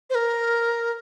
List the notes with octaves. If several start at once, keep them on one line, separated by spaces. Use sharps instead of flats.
C5
A#4